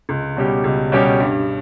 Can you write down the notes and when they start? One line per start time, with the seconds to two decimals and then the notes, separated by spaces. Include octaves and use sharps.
0.09 C#2
0.36 B2 G3 C#4 G4
0.64 C#2
0.92 B2 G3 C#4 G4
1.20 G2